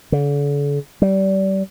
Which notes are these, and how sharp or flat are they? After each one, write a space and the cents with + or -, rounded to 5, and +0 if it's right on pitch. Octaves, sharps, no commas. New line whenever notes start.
D3 -40
G3 -30